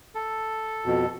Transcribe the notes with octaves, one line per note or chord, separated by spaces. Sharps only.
A4
F2 B2